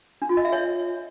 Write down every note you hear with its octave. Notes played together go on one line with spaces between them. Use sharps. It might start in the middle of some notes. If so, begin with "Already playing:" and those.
D4
F4
D#5
E5
C#5